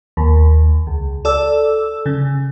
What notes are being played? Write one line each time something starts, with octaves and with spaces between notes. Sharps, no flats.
D#2
C#2
A4 D5 E6
C#3